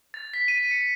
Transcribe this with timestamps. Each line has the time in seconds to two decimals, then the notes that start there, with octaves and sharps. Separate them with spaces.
0.14 A6
0.34 B6
0.48 D#7
0.71 C#7